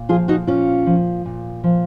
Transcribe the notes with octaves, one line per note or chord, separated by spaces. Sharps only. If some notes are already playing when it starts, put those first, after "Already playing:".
Already playing: A#2
F3 F4 G#4
D#4 F#4
A#2 C#4 F4
F3
A#2
F3